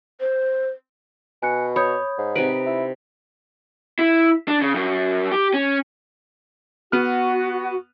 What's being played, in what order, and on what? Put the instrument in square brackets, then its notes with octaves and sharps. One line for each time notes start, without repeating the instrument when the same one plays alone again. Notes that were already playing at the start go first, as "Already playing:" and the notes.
[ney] C5
[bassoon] B2 [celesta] G#5 F#6 C#7
[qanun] C#5 [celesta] B5 D#6 G6
[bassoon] G#2
[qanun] C3 D#4 B4 [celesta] D7
[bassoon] E4
[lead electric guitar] E4
D4
C#3
F#2
G4
C#4
[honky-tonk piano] B3 F6 [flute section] F#4